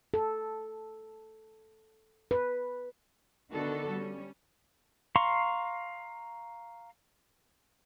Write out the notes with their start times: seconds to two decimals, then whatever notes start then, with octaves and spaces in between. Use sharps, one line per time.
0.14 A4
2.31 B4
3.52 D3 D#3 B3 D4 F#4 A4
3.90 G3 C#4
5.16 F5 A#5 C6 C#6